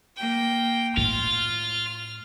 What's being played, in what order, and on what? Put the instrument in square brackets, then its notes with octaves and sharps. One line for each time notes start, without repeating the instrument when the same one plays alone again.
[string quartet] A#3 G5
[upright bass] A2 [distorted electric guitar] F4 [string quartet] F6